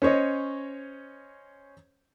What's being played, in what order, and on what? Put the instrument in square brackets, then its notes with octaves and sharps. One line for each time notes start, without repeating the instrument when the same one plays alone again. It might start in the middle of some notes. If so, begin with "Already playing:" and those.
[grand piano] C#4 C5 C#5 D#5